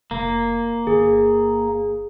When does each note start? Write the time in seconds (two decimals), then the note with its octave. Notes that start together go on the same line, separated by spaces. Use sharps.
0.11 F1 A#3
0.87 G1 G#4